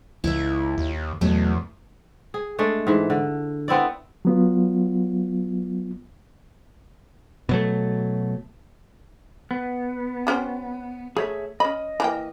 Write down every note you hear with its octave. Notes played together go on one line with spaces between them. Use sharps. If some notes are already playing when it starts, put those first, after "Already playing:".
C#2 E4 E5
D#2
E2 B2 F#3 A3
G#4
G#3 A3 D4 G#4
G#2 E3
D3
B3 C4 E4 D5
F#3 B3 F4
B2 F#3 A3
B3
C4 C#4 F#4
A3 G#4 C#5 E5
C#4 D#5 B5
E3 A#3 G5